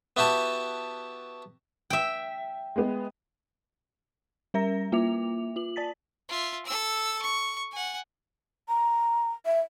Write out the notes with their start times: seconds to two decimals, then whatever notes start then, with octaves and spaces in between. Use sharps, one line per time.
0.17 B3 E4 F#4 G4 A5
1.90 E5 G5
2.76 G#3 B3
4.54 G3 C#4 A#4 E5 A#5 A#6
4.92 A#3 F4 E5 D6 F7
5.56 F4 F#7
5.76 D5 A5 A6 B6
6.29 F4 E5
6.66 A4 E6
7.22 C#6
7.72 F#5 G#5
8.68 A#5
9.46 E5